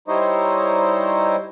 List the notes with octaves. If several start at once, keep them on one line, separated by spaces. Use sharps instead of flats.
G3 D#4 E4 C5 C#5 D#5